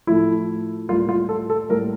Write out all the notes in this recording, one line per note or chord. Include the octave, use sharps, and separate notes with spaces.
A2 F3 A3 E4
A2 G3 A#3 F4
F4
A4
A4
A2 G3 A#3 A#4